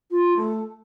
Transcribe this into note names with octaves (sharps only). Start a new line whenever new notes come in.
F4
A3